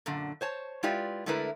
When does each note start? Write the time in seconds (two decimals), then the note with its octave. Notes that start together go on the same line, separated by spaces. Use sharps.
0.06 F#2 A#2 D3
0.41 C5 C#5 A5
0.83 G#3 E4 F4 G4 B4 D5
1.26 D3 G#3 A3 E4 A#4 B4